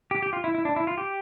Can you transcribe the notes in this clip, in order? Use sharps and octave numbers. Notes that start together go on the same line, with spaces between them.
G4
G4
F4
E4
E4
D4
E4
F4
G4